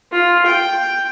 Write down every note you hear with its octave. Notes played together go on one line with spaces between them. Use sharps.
F4
G5